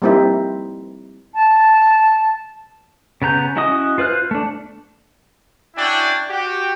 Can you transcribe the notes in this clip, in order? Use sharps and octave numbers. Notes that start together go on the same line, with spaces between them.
G3 A#3 C4 D#4 E4
A5
C#3 B3 A#5 G6
C#4 E4 F#4 D#5 D#6
F4 B4 C5 F6 F#6
A3 D4
C#4 D4 E4 F#4 D5 G5
F#4 G4